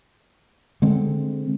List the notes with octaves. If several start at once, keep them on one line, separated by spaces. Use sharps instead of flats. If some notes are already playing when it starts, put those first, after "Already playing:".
D3 G#3 C4